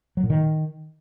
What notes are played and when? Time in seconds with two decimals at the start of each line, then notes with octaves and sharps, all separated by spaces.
0.17 F#3
0.23 A#2
0.30 D#3